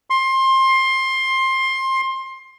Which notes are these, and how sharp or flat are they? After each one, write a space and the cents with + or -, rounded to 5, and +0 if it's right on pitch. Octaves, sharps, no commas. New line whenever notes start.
C6 +20